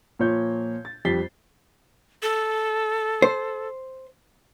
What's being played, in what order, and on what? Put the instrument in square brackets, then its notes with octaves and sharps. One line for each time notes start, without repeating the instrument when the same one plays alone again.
[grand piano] A#2 F3 C#5 G6
A6
F2 G3 A6 B6 C7 G7
[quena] A4
[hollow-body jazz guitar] C5